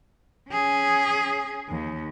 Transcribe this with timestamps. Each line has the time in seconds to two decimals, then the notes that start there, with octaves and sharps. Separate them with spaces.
0.50 C#4 G#4
1.69 D#2